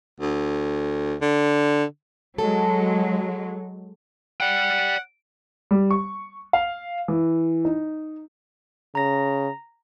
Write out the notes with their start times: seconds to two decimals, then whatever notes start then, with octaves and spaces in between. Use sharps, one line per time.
0.20 D2
1.22 D3
2.38 F#3 G#3 A4
4.41 D5 F#5 G5
5.71 G3
5.91 C#6
6.53 F5
7.08 E3
7.65 D#4
8.95 C#3 A#5 A#6